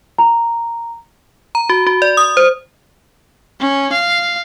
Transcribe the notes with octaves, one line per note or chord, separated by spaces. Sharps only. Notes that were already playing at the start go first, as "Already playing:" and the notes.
A#5
A#5
F#4
F#4
D5
D#6
C5
C#4
F5